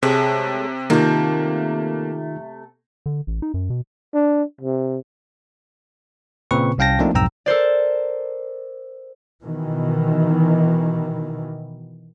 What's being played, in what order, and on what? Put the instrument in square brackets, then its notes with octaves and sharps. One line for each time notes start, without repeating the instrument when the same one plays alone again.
[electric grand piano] C3 [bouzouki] G#3 A3 C#5
[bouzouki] C3 A3 [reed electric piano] D#3 D#4 F4 [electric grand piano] A#3
[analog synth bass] D3
A1
D#4
F#2
B2
[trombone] D4
C3
[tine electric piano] A#2 C#3 C4 B4 C#6
C2 C#4 F5 G5 A5 A#6
F3 A3 A#3 C4 D4 D#4
B1 F2 G#2 G5 A#5 E6
[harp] A4 A#4 C5 D5
[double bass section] B2 D#3 E3